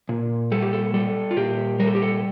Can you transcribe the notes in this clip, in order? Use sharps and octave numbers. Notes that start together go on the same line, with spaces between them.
A#2
G3 A4
G4
A4
G3 A4
F4
A#2 G4
G3 A#4
A4
G4
A4